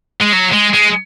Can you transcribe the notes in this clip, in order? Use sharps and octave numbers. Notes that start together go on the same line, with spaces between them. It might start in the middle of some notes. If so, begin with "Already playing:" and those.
G#3
F#3
G#3
G#3